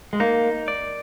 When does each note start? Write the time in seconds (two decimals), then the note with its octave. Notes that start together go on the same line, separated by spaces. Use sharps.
0.13 G#3
0.20 A#3 D#4
0.68 D5